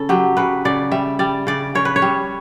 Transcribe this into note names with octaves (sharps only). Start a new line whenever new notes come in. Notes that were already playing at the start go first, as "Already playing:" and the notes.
Already playing: C#3 A4
F#3 G4
C#3 B4
C#3 D5
G3 E5
G3 D5
C#3 D5
C#3 C#5
B4
C#5
G3